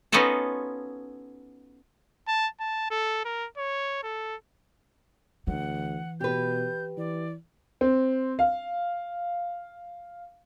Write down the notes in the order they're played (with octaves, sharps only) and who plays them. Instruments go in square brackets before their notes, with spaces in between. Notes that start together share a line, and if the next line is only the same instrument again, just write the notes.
[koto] B3 C#4 D#4 F4 F#4 A4
[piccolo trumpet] A5
A5
A4
A#4
C#5
A4
[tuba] D2 [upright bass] E3 [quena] F#5
[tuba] B2 [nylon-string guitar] G4 B4 [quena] G6
[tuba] E3 [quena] D5
[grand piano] C4
F5